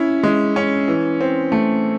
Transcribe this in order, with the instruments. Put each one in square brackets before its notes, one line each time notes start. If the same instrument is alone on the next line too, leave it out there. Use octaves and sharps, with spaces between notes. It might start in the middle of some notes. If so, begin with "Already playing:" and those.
Already playing: [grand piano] C#4 E4
G#3
C#4
E3
C4
A3